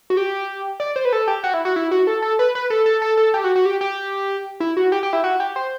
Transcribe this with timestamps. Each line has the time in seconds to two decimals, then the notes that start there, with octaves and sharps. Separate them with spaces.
0.10 F#4
0.17 G4
0.80 D5
0.96 C5
1.05 B4
1.13 A4
1.27 G4
1.44 F#4
1.54 E4
1.65 F#4
1.76 E4
1.91 F#4
2.07 A4
2.22 A4
2.39 B4
2.55 B4
2.70 A4
2.86 A4
3.02 A4
3.17 A4
3.34 G4
3.44 F#4
3.56 F#4
3.66 G4
3.81 G4
4.60 E4
4.77 F#4
4.92 G4
5.03 G4
5.13 E4
5.24 F#4
5.40 G4
5.56 C5